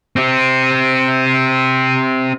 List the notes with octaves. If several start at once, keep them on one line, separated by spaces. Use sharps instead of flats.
C4 G4